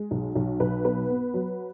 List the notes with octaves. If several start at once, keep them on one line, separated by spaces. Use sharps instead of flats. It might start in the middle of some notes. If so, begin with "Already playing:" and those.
Already playing: G#3
B1
B1
B1 B4
B3 B4
B3
F#3